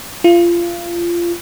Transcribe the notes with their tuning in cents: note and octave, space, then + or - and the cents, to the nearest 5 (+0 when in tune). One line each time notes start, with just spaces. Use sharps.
F4 -25